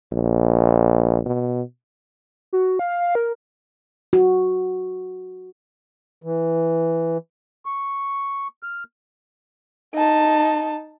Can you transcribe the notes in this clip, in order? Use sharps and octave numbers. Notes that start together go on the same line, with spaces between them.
A#1
B2
F#4
F5
A#4
F#4
E3
C#6
F6
D#4 A5